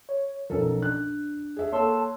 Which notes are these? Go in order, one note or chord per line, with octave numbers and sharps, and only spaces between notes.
C#5
B1 F3 C#4 A4 A#4
D4 F#6
G#4 E5
A#3 A4 C#5 A5 C6 E6